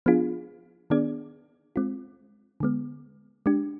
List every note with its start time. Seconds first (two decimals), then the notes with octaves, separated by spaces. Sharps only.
0.06 F3 B3 D4 F4 G#4
0.90 D#3 B3 D4 G#4 D5
1.76 G#3 C4 F4
2.60 D3 G#3 B3
3.46 G#3 D4 G4